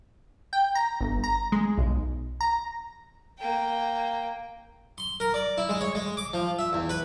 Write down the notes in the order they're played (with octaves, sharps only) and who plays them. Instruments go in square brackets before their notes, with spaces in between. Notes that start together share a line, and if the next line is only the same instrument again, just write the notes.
[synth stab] G5
A#5
G1
A#5
G#3
B1
A#5
[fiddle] A#3 G5
[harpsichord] C6
A#4
D5
E4
G#3
C#5
G#3
D6
F3
E5
E2
B4